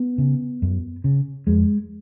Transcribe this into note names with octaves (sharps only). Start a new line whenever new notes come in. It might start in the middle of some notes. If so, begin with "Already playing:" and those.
Already playing: B3
C#3
F#2
C#3
F2 G#3